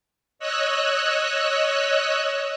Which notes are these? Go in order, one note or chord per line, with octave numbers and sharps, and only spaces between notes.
C#5 D#5 E6 F#6